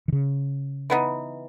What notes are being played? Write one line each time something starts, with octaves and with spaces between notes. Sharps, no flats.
D#3
C#3
E3 B3 D#4